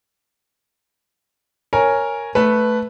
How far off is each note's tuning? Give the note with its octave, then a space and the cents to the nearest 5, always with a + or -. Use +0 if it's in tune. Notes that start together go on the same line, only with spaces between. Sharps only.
A#4 +0 C#5 +0 G#5 +0
A3 +0 B4 +0